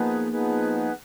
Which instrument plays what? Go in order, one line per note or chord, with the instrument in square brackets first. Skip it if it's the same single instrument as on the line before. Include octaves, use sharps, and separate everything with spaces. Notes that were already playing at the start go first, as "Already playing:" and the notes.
Already playing: [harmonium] F3 B3 D#4 G#4 B4 [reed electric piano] A#3
[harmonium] F3 B3 D#4 G#4 B4